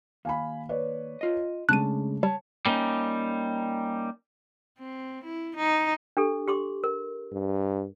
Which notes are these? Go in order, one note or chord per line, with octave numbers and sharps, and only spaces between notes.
D#2 F5 G#5 B5
B4 C#5 D5
F4 D#5
C#3 G#3 A3 D4 A5 F#6 D#7
G3 C#5 A5
G3 A#3 C#4 D#4
C4
E4
D#4
D4 G4 A4
G4 C6 D6
A#4
G2